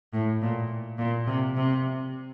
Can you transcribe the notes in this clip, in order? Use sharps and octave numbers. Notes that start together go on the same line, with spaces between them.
A2
A#2
A#2
C3
C3